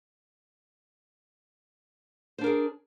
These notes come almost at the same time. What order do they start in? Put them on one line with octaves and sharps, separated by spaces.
C5 D4 A#4 G#4